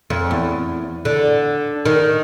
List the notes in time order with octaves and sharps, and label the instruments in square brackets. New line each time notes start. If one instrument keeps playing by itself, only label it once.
[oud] F2
E2
D3
D#3